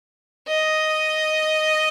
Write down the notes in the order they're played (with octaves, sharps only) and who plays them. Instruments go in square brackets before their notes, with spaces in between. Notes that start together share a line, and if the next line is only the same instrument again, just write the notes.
[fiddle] D#5